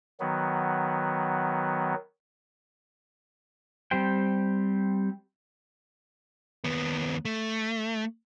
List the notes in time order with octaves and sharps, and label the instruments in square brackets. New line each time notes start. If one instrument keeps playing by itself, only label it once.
[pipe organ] D#3 F#3 B3
[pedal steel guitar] G3 C4 G4 C5 G5
[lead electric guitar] D#2 B3
A3